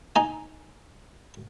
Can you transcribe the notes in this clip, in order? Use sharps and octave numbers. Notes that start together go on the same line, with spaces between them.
D#4 G#5